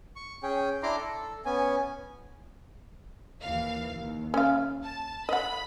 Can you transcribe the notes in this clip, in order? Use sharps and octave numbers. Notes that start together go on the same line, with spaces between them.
C#6
C#4 G#4 G5
D4 E4 A#5 C6 D6
A4
B3 C#4 G#5
D#2 E3 F5
D#2
C#4 F5
A5
D#5 F#5 B5